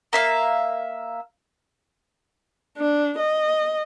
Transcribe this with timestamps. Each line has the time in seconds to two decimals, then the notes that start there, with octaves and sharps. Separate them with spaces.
0.13 A#3 E5 F5
2.78 D4
3.18 D#5